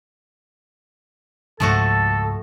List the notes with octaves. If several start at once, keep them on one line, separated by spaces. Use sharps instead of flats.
C#2 G#2 F3 A3 F#4 A4 A5